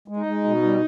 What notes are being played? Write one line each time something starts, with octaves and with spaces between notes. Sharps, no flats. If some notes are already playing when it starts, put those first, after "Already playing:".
G#3
D#4
G#3
B2
G3